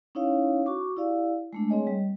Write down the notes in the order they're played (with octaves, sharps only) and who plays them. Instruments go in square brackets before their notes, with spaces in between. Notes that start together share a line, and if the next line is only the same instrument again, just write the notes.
[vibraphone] C#4 D#4 E4 C#5 F5
F#4 C#6 D6
E4 G4 D5 F5
G#3 A3 D4
C4 G#4 C#5 D#5 G#5
G3